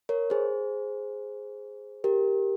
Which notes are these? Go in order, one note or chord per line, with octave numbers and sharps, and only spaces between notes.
A#4 C#5
G#4 C5
G4 A#4